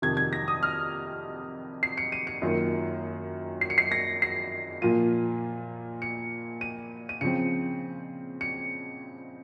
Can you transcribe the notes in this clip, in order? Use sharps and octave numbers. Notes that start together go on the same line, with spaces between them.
F2 C3 D#3 G#6
G#6
A#6
D#6
F6
C7
C#7
D#7
C#7
F#2 D#3 A#3 F4
C7
C#7
C7
A#6
C7
A#2 F3 A#3 F4 D#7
C#7
D#7
D#7
C#3 F3 C4 C#7
C#7